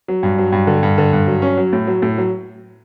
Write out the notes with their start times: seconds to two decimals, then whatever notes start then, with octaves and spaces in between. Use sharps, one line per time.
0.08 F#3
0.23 G2
0.38 F#3
0.52 G2
0.67 D3
0.83 G2
0.98 D3
1.13 G2
1.27 F#3
1.42 C#4
1.57 F#3
1.73 A2
1.87 F#3
2.02 A2
2.18 F#3